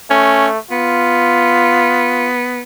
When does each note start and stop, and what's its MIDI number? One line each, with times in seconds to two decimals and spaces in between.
0.10 0.58 57
0.10 0.47 61
0.71 2.62 59
0.71 2.29 65